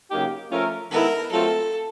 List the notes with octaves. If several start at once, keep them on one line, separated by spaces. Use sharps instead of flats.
C#3 F#3 A#3 D#4 G4
F3 A3 C#4 F4 A#4
D#3 G#3 B3 E4 A4 A#4
F#3 A3 C4 F4 A4